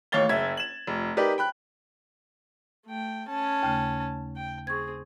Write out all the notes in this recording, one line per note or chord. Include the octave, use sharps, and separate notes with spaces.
A1 D#2 C#5 F5 A6 G7
F#1 E5 G#6
E7 F#7
F1
D#4 G4 A#4 B4 D5
G5 B5 F#6
A3 G5
C#4 A5
D#2 C#3 A3
G5
C4 G#4 C#6 G#6